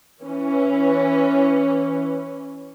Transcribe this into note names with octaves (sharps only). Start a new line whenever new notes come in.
E3 C#4